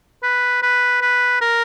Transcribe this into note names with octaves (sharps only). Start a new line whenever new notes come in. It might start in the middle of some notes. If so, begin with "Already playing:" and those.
B4
B4
B4
A#4